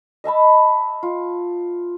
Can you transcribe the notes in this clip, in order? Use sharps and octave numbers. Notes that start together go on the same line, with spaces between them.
D#5 E5 A5 B5
F4